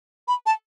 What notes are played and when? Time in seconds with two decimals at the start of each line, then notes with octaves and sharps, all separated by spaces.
0.28 B5
0.46 A5